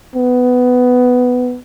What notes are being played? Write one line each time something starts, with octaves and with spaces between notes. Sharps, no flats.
B3